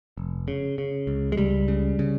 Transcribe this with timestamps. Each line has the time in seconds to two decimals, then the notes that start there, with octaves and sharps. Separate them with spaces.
0.17 F1
0.48 C#3
0.78 C#3
1.07 C#2
1.32 G#3
1.37 C#2 G3
1.68 C#3
1.99 C#3